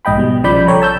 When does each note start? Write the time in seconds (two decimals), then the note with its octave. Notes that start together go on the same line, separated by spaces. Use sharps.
0.05 A#1 G#2 D#5 G5 B5
0.17 B2 G3
0.43 A#1 C#3 F3 D5 B5 G6
0.66 A4 C#5 G5 A#5 B5
0.81 C#5 A5 E6 G6